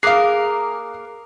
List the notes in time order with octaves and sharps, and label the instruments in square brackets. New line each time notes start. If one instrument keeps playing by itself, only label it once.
[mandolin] A#3 A#4 [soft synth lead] G#4 [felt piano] F5 F#6 [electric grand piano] D6 D#6 C7